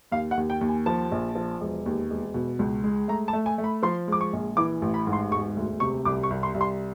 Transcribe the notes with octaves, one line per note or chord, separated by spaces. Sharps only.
D#2 F5
F#5
D#2
G5
D#2
G#5
F3 A5
A#1
F3
E1
D#2
E1
B2
C#2
G#3
A3 A#5
A5
A3
G#5
A3
B5
F3 C6
G#3 D6
C#6
A#1
E3 D6
A1
B5
G#2
C6
E1 C#6
D2
C3 C#6
C2 D6
C#6
C2
C6
C2
C6